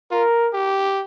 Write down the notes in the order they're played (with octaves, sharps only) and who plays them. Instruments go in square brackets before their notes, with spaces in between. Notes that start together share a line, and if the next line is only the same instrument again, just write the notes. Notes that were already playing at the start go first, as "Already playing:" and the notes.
[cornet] F4 [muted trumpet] A#4
[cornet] G4